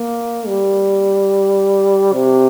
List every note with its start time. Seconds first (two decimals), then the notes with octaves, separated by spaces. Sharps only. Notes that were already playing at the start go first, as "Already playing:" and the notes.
Already playing: A#3
0.47 G3
2.13 C3